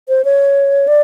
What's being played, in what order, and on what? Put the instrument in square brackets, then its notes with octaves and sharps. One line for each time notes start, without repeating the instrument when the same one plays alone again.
[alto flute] C5
C#5
D5